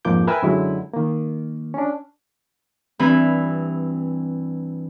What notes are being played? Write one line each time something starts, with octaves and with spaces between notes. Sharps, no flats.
F2 G#2 F3 A#3 D6 G6
A#4 B4 E5 G5 G#5 E6
F#2 D3 F#3 G#3 E4
D#3 A#3
C#4 D4
G2 E3 C4 B5